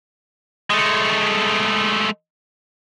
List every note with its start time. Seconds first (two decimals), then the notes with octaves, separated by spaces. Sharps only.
0.70 G#3 A3